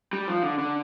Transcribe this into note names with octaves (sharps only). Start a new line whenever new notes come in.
G3
F3
D3
D3